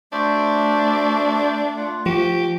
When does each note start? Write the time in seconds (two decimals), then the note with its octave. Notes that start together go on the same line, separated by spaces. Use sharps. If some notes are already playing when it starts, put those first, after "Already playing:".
0.12 A3 D4 F#4 C5 E5
1.77 F4 F#5
2.06 F3 G4 C#6